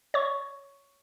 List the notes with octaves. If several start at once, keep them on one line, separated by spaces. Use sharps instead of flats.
C#5 C#6